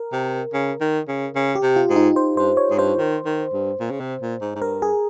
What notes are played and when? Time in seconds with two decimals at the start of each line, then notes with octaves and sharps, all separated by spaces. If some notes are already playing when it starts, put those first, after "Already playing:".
Already playing: A#4
0.13 C3
0.54 C#3
0.81 D#3
1.08 C#3
1.35 C#3
1.55 G4
1.63 C3
1.76 F4
1.90 G#2
1.96 D#4
2.16 C5
2.37 G2 C5
2.57 C#5
2.71 G#2
2.78 G2 C5
2.98 D#3
3.25 D#3
3.53 G2
3.80 A#2
3.91 C#3
4.00 C3
4.21 A#2
4.41 G#2
4.56 G#2
4.62 G2 A#4
4.82 G#4